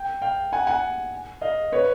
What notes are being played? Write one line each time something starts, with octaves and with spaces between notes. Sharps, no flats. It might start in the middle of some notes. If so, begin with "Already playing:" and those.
Already playing: G5
F5 G5
F#5 G#5
F#5 G#5
D#5 F5
B4 C#5